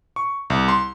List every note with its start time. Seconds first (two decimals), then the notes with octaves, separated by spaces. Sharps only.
0.16 C#6
0.50 C2
0.68 C6